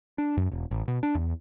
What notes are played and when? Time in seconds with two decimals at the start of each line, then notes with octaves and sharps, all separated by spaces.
0.18 D4
0.37 F#2
0.52 E1
0.71 A1
0.88 B2
1.03 D4
1.15 E2